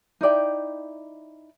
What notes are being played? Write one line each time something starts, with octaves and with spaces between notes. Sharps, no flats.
D#4 E4 D5 G5